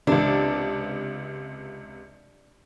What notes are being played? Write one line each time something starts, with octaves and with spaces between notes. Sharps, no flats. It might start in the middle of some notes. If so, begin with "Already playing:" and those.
C#2 C3 D4